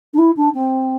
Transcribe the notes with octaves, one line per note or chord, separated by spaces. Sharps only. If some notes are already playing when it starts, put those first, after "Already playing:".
D4
E4
D4
C4